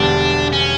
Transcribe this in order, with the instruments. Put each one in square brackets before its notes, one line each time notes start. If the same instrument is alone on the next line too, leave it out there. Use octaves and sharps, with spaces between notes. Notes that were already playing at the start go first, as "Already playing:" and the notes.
Already playing: [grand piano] E1 E2 D3 G3 [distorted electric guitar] D4
[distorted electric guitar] C#4